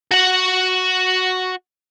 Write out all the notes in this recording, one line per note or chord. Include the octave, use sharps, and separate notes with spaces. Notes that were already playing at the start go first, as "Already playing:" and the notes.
F#4 F#5